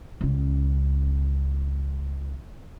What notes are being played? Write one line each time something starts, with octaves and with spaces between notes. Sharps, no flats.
C#2 C#4